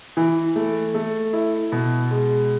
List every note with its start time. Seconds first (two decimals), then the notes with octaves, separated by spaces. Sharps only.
0.17 E3
0.56 A3
0.94 A3
1.33 E4
1.72 B2
2.11 G#3